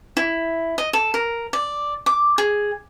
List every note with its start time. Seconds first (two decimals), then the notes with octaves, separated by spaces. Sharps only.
0.17 E4
0.78 D#5
0.93 A4
1.14 A#4
1.53 D5
2.06 D6
2.38 G#4